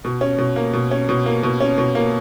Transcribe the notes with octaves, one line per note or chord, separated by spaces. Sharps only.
B2
C#4
B2
A#3
B2
C#4
B2
A#3
B2
C#4
B2
A#3